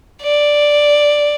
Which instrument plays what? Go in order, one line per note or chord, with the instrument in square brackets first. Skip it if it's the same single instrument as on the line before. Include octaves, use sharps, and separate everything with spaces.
[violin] D5